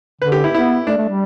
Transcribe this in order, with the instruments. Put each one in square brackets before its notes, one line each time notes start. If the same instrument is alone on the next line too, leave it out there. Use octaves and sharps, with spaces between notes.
[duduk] D3 [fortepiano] B4
[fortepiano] G4
E4
[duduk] B3 [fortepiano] E4
[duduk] A3 [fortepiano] D4
[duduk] A3
G3